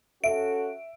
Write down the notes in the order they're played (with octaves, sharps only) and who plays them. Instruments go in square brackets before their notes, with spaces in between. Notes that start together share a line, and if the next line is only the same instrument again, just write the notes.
[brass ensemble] C#4 F#4 A4 [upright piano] E5 [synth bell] D7